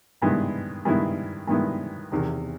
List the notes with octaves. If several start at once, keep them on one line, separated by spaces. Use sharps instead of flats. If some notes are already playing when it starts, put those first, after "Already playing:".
G2 D#3 G#3 B3 E4
G2 D#3 G#3 B3 E4
G2 D#3 G#3 B3 E4
E2 C3 D#3